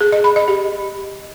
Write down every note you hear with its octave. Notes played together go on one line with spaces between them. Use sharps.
G#4
D#5
B5
D#5
G4